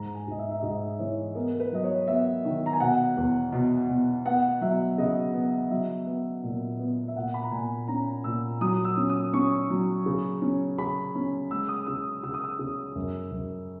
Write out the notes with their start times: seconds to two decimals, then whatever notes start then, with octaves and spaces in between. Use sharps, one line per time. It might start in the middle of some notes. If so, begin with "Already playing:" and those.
Already playing: G#2 A#5
0.14 G#5
0.27 G#2 D#5
0.39 E5
0.51 E5
0.62 G#2 D#5
0.99 E3 C#5
1.35 B3 A#4
1.54 A#4
1.60 B4
1.72 F#3 D#5
1.84 C#5
2.08 B3 E5
2.45 D#3
2.66 A#5
2.73 G#5
2.80 B2 F#5
3.17 E2
3.53 B2
3.89 B2
4.26 B3 F#5
4.61 F#3 E5
4.98 C#3 D#5
5.34 B3
5.71 F#3 E5
6.07 B3
6.44 A#2
6.79 B3
7.08 E5
7.16 A#2 F#5
7.34 B5
7.43 A#5
7.52 A#2 G#5
7.88 C#4 A#5
8.24 A#2 E6
8.61 F#3 D#6
8.85 E6
8.97 C#4
9.09 D#6
9.33 C#4 C#6
9.70 F#3
10.06 C#3
10.42 C#4
10.78 C#3 B5
11.15 C#4
11.51 G#3 E6
11.68 D#6
11.87 C#3 E6
12.23 C#3 E6
12.34 D#6
12.44 E6
12.59 C#3
12.95 F#2
13.32 F#2